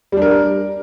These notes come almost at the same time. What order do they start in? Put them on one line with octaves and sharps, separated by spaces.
G3 D4 A#4